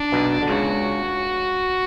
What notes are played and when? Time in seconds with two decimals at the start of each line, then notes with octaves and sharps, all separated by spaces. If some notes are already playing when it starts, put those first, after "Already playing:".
Already playing: D4
0.12 B1 B2
0.42 D3
0.49 C#2 C#3 F#4